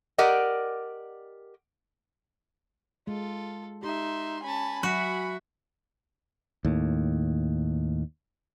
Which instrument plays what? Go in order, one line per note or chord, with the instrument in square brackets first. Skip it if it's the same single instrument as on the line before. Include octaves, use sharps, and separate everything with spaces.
[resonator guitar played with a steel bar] G4 A#4 D5 D#5 F#5
[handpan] G#3 [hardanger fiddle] F4 A4
[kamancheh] D#4 E5 [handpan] G4 [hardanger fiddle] C6
[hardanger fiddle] C#4 A5 [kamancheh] G#5 B5
[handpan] F#3 [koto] F#4 [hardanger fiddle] E5 F#5
[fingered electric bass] D#2 A2